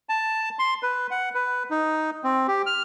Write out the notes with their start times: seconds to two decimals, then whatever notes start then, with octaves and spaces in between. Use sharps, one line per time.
0.09 A5
0.59 C6
0.83 B4
1.11 F#5
1.35 B4
1.71 D#4
2.24 C4
2.48 G4
2.66 F6